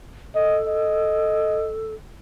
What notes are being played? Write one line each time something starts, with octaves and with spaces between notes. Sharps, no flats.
A4 D#5
D#5